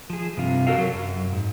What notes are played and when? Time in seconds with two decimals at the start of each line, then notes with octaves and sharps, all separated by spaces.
0.10 F3 G#4
0.37 G2 C3 F4
0.67 F#4 A4 A#4 F5
0.78 F#3
0.93 F#2
1.33 G#2